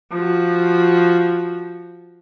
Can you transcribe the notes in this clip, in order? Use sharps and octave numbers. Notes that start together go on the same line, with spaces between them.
F3 F#4